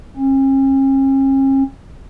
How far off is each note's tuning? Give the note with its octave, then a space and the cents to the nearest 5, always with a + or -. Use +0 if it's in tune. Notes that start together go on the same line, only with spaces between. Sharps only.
C#4 -45